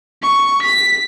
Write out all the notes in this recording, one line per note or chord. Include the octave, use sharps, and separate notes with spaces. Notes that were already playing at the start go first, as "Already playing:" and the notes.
C#6
B6